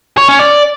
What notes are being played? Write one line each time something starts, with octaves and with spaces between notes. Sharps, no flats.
C#5
C#4
D5